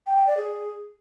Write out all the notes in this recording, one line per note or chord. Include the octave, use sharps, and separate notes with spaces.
G5
G5
D5
G#4